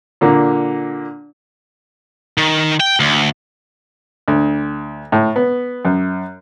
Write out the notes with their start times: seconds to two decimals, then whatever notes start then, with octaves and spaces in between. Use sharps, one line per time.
0.21 A#2 D3 A#3
2.38 D#3
2.80 G5
3.00 D2
4.28 D2
5.12 A2
5.36 B3
5.85 F#2